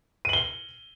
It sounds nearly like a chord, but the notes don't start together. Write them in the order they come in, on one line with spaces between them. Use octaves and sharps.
D#7 F#7 G7